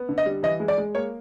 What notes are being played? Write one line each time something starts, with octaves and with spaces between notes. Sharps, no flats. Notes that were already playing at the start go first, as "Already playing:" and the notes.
Already playing: B3
D3
D#5
G3
E3 D#5
G#3
D5
G#3
A#3 C#5